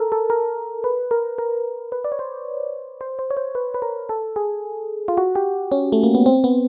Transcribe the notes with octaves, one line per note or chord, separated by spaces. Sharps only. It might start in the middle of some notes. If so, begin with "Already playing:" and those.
Already playing: A4 A#4
A4
A#4
B4
A#4
A#4
B4
D5
C#5
C5
C5
C5
C#5
C5
B4
B4
A#4
A4
G#4
F4
F#4
G4
C#4
A3
A#3
B3
C4
B3